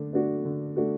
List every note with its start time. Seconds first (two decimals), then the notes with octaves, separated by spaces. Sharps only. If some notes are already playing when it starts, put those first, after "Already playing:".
Already playing: D3 A3 D4
0.13 A3 D4 F#4
0.45 D3
0.76 A3 D4 F#4